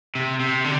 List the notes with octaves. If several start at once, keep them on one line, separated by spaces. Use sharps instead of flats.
C3
C3
D3